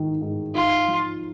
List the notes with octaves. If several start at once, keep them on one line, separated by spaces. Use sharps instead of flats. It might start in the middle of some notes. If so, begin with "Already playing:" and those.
Already playing: G#2 D#3
G#2
D#4 F4
F3